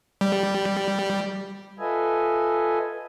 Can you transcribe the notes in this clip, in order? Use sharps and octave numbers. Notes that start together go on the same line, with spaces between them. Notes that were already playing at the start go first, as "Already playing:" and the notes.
G3
F4 A4 B4 D#5 E5 G#5